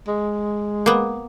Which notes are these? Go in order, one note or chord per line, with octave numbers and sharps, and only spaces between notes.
G#3
A#3 B3